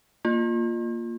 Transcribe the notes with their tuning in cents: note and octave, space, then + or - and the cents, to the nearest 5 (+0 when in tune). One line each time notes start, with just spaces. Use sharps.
A#3 +0 F4 +0